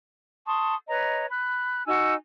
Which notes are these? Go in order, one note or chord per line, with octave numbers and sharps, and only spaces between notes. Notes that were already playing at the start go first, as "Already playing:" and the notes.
A5 C6 C#6 D#6
B4 C#5 D#5 A#5
B5 F#6
D#4 F#4 G#5 E6